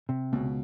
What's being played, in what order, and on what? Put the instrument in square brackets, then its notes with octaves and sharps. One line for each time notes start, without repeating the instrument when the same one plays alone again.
[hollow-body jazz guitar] C3
[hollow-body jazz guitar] C#2 [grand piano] B2